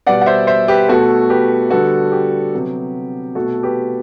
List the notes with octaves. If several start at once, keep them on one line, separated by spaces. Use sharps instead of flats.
B2 G3 B3 D5 F#5
F#5
C5 E5
C5 E5
G4 B4
B2 A3 F#4 A4
G4 B4
D3 G3 B3 F#4 A4
G4
C3 F#3 B3
B2 A3 F#4 A4
G4 B4